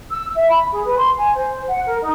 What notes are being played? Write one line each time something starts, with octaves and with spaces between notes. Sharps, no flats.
E6
E5
B5
G#4
B4
C6
G#5
C5
F#5
A#4
D#4